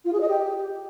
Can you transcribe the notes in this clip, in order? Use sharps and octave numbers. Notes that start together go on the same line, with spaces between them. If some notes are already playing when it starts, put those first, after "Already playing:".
F4
G#4
D#5
G4